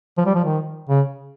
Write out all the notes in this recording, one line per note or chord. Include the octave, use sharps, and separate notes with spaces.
F3
G3
F3
D#3
C#3